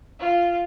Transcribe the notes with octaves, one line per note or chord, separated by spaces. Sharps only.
F4